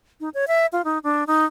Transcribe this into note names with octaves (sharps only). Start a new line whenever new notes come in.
D#4
C#5
E5
F4
D#4
D4
D#4